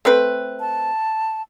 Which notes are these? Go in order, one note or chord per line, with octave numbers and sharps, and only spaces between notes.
A3 C4 B4
A5